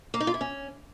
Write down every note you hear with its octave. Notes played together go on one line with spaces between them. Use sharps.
A#3
D#4
F4
E4
C#4